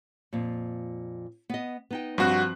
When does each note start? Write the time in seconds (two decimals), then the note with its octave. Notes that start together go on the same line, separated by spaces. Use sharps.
0.33 F2 A#2
1.49 B3 D#5
1.91 B3 D#4 G5
2.18 G2 F3 C4 F#4 F#6